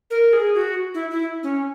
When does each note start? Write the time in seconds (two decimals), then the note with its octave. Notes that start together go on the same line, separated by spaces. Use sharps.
0.10 A#4
0.33 G#4
0.54 F#4
0.94 E4
1.10 E4
1.43 C#4